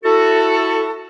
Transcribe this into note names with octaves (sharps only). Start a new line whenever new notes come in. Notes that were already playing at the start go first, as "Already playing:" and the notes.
E4 F#4 A4